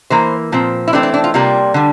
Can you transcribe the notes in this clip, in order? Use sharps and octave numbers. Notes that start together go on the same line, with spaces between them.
E3 A#3 C5
A#2 F3 C4
E4
E3 A3 C4 D4
D4
D4
F4
C3 G3 A#3 F4
D3 G3